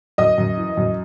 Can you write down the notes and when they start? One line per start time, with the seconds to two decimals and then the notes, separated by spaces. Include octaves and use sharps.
0.18 F#2 D#5 D#6
0.38 F#2
0.57 E3
0.77 F#2